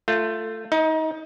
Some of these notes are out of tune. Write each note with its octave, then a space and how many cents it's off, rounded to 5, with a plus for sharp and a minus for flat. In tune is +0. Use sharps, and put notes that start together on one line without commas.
A3 +15 F4 +0
D#4 +30 D#5 +0